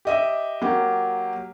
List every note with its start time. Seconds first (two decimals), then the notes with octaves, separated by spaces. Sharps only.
0.05 G4 D#5 E5
0.62 F#3 A#3 G4